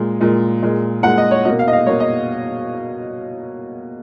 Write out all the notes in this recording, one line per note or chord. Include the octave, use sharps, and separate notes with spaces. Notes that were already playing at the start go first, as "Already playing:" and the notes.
Already playing: A#2 G#3
A#2 G#3
A#2 G#3
A#2 G#3 F#5
D#5
C#5
B2 A#3 D#5
F5
D#5
F5
B2 A#3 C#5
D#5